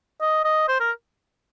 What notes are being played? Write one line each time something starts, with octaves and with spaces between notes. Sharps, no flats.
D#5
D#5
C5
A#4